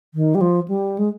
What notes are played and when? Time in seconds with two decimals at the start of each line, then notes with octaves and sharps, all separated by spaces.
0.14 D#3
0.35 G3
0.41 F3
0.68 G3
0.98 G#3